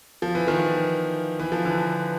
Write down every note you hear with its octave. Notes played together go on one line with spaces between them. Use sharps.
F3
E3
D#3 F3
E3
F3
D3 E3